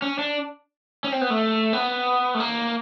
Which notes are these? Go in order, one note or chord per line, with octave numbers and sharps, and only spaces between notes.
C#4
D4
C#4
C4
B3
A3
B3
A3
A#3